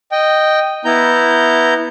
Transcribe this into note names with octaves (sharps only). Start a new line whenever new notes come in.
D#5 G5
B3 E4 A#5 G6